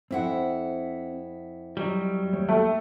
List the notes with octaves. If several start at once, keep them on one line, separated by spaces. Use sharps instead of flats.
F2 C4 E4 F#5
F#3 G3 F#4 D#5
D#2 A3 C#5
A3 A#3 G5